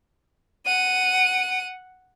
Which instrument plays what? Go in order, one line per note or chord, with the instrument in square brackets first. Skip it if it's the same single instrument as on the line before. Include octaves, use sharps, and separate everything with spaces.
[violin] F#5 D#7